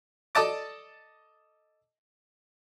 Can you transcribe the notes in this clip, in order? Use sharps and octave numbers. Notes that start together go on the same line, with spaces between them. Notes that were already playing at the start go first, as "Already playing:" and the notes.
A4 D5 D#5 A5 D6